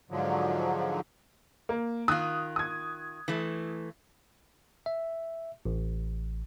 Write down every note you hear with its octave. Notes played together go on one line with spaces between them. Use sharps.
G#2 D3 F3 F#3
A#3
D#3 F4 D#6 F#6
D#6 G#6
E3 A3
E5
A1